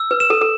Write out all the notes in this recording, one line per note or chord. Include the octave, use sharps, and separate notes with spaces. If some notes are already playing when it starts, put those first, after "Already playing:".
Already playing: E6
B4
E7
A4
A4